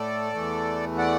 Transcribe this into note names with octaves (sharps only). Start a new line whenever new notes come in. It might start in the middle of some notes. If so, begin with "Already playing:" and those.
Already playing: A2 A3 A4 D5
E2 E3 A3
D5 F#5